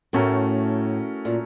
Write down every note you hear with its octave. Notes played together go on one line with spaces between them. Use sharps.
A2 A3 C#4 F#4 A#4
A#2